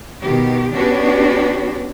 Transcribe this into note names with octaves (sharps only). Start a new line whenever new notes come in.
B2 D#3 B3 G4
B3 C#4 D4 F#4 G4 B4